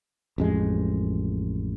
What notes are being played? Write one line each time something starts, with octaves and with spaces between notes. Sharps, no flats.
A1 F2 G#3